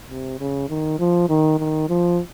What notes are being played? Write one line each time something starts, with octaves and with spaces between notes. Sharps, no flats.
C3
C#3
D#3
F3
D#3
D#3
F3